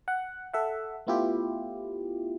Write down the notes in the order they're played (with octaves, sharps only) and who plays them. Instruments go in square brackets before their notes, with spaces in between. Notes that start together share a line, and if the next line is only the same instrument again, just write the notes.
[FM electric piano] F#5
A4 E5 F#5
A3 B3 E4 F4 G4